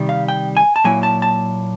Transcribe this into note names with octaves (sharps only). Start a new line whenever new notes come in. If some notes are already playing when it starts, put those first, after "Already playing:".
Already playing: C3 D#3 G3
F5
G5
G#5
A5
A#2 F#3 A#3 E4 G#5
A5
A5